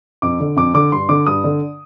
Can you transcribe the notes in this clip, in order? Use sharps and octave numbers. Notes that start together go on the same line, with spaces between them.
F2 D6
D3
F2 D6
D3 D6
G2 C6
D3 D6
G2 D#6
D3